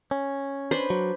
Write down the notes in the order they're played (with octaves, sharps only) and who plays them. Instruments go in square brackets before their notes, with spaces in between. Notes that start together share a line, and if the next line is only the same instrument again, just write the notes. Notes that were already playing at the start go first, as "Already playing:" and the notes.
[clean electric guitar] C#4
[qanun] D4 B4 C5
[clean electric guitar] F#3